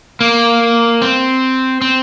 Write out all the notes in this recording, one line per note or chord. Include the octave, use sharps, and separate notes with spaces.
A#3
C4
C4